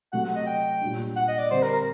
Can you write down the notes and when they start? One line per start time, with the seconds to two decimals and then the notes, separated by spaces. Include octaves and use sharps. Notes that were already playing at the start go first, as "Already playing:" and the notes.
0.13 C3 F#3 A3 F#5
0.24 F#5
0.35 D#5
0.47 G5
0.81 A#2 G3 D4
1.16 F#5
1.28 D#5
1.39 D5
1.50 D3 G3 C4 C5
1.62 A#4
1.73 A#4